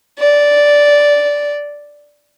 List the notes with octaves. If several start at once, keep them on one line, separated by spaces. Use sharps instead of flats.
D5